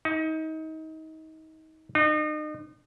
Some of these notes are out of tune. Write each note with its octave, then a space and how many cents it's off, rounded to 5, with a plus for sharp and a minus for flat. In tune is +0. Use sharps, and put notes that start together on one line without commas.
D#4 +30
D#4 -35